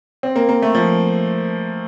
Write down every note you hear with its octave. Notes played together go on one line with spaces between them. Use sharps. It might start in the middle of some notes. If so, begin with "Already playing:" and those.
C4
A#3
A#3
A3
F3